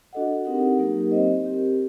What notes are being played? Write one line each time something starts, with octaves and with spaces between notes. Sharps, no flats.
D4 F#4 A4 D#5 F#5
C4 D#4 G4 A#4 F#5
F#3 A#3 D#4 G4 A#4
C4 G4 C5 D#5
C4 G4 A#4